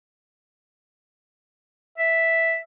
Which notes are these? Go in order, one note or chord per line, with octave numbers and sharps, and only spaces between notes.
E5